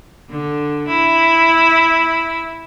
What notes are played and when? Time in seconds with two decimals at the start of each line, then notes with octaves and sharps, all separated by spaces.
0.30 D3
0.88 E4